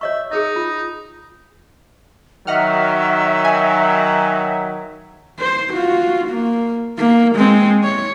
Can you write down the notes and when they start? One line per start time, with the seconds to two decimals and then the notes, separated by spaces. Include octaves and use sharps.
0.01 C#5 D#5 E5 C#6
0.31 D#4 G#4 A#4 D#5
0.56 F4
2.47 D#3 F#3 D#5 E5 F#5 F6
3.45 G#5
5.39 C5
5.74 F4 F#4
6.29 A#3
6.98 A#3
7.36 G#3 C4
7.84 C#5